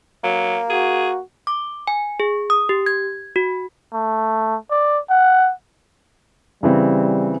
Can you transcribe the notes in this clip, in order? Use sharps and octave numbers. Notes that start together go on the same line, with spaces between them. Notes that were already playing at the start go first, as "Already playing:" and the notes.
F#3 A#3
F#4 G#4
D6
G#5
G#4
D#6
G4
G#6
F#4
A3
D5
F#5
C#3 E3 G3 C4